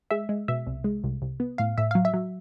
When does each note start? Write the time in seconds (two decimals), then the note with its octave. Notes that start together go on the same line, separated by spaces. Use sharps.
0.11 G#3 E5
0.29 G#3
0.48 B2 E5
0.67 C2
0.84 G#3
1.04 C2
1.22 C2
1.40 B3
1.58 A2 F5
1.78 A2 E5
1.91 F#3 F5
2.05 E5
2.14 F#3